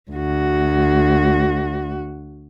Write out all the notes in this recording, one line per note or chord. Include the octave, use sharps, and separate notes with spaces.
D2 F#4